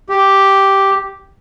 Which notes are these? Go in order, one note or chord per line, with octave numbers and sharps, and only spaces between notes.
G4